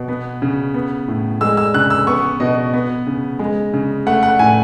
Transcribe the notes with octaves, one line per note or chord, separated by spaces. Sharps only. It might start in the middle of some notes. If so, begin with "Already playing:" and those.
Already playing: B2
B3
C#3
B3
A2
G#3 E6
E6
C#3 F#6
E6
B3 C#6
B2 D#5
B3
C#3
G#3
C#3
A3 F#5
F#5
A2 G#5